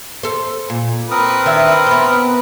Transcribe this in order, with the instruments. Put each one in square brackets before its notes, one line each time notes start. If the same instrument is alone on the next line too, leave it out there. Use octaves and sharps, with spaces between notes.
[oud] A4 C5
A#2
[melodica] C4 A#4 D#6 [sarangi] B4
[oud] D#3 D4 E5
B3 C5